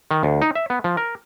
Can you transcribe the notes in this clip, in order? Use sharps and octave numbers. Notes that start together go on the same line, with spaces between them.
D#3
D2
D#4
E5
B3
F3
A#4